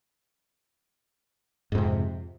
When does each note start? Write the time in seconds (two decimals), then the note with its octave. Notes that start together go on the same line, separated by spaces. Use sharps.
1.72 G#2
1.75 F2
1.78 C3